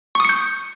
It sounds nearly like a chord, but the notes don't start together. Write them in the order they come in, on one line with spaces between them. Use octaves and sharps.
C#6 D#6 C#7 G6